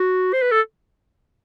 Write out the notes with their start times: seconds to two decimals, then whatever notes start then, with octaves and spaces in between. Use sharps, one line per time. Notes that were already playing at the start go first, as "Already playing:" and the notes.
Already playing: F#4
0.33 C5
0.42 B4
0.52 A4